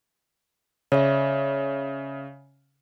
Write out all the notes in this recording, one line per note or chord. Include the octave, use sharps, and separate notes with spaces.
C#3 C#5 D5 E5